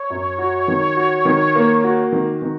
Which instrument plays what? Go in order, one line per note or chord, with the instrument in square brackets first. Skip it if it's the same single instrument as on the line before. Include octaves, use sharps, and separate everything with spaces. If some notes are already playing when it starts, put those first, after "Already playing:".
Already playing: [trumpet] C#5
[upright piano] F#2
F#4
D#3
F#4
D#3
A#3
F#4
D#3
D#3